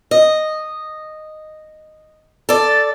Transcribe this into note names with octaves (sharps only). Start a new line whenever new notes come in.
D#5
A4 D5